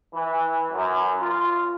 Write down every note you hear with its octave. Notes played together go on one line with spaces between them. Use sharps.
E3
F#2
F4